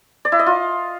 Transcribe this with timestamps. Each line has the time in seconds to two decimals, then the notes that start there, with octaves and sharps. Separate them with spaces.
0.25 D5
0.32 E4
0.39 D#5
0.46 F4